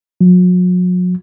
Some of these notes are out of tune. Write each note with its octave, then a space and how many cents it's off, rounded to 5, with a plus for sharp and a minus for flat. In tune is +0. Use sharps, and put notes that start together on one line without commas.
F#3 -40